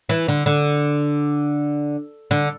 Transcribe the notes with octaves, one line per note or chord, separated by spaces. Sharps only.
E3
D3
D3
D3